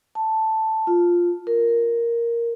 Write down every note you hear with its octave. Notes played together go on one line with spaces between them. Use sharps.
A5
F4
A#4